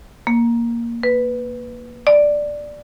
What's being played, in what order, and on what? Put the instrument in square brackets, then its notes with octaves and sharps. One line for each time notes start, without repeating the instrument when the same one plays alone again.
[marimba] A#3
B4
D5